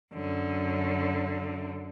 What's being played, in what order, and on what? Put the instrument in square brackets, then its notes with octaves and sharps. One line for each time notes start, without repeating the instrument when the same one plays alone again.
[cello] F#2 D3